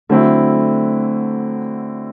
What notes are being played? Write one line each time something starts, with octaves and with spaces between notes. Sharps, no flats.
D3 F#3 A3 C4 E4